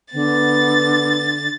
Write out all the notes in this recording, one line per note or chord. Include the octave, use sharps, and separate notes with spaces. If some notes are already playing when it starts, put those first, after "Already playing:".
D3 B3 A6